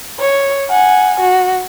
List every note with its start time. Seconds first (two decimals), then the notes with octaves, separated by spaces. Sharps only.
0.20 C#5
0.70 F#5 G#5
1.20 F#4